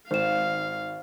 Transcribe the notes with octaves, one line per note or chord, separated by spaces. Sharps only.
G#1 C5 F5 E7